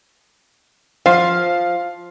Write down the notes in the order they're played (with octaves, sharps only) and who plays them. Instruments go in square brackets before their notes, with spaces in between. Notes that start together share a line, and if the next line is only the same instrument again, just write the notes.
[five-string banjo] F3 [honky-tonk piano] F5